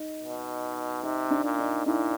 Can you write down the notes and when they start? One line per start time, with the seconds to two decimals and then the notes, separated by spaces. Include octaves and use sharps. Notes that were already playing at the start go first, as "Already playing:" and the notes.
Already playing: D#4
0.22 B2
1.03 C3 D#4
1.31 D4
1.44 A#2
1.59 D#4
1.86 A#2 D4 E4